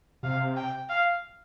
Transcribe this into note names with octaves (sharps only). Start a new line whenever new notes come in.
C3 F5
G5
F5